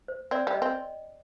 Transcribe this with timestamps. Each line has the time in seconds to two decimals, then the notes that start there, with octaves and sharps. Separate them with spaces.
0.08 C5
0.31 C4 D5
0.47 G3
0.54 D#5
0.62 C4